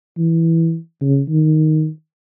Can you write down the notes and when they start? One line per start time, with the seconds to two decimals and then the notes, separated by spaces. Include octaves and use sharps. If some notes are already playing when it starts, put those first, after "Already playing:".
0.17 E3
1.01 C#3
1.29 D#3